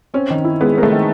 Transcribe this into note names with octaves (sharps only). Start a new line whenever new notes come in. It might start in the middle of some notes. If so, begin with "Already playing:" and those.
C4 C#4
D#3
E4
G#3 B3
A#3 C4
A3
D#3